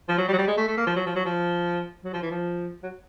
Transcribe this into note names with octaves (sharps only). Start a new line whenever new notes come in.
F3
F#3
G3
F#3
G3
G#3
A3
A3
A#3
F3
F#3
F3
F#3
F3
F#3
F3
E3
F3
F#3